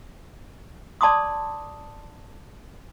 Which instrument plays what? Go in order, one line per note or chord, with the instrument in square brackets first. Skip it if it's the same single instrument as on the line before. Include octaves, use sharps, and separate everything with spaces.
[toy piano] D5 A5 C6 D6 D#6